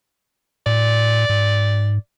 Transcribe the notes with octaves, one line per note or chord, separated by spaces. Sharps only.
A2 D5
G#2